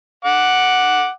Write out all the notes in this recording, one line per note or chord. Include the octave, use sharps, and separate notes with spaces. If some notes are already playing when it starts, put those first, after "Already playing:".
F#5 D6